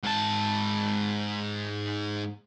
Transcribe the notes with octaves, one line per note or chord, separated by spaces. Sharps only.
G#2 A5